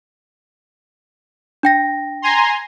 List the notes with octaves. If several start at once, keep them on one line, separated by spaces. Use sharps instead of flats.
D4 G5 A#6
G#5 A#5 C6